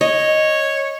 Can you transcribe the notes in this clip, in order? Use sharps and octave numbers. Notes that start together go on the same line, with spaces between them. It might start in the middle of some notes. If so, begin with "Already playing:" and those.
C#5 D#5